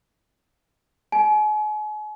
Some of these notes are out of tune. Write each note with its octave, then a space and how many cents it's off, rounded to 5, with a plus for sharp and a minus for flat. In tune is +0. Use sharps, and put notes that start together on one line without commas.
G#5 +40